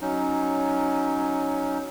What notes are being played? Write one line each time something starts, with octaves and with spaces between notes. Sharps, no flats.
F#3 C#4 D#4